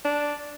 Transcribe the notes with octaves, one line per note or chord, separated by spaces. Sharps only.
D4